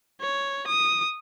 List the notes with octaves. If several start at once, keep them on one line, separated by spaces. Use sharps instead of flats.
C#5
D#6